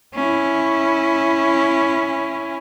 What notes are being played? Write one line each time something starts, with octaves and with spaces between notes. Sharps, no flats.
C#4 E4